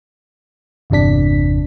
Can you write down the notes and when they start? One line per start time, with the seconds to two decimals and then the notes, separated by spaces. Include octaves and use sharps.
0.90 G1 E2 C3 D4 B6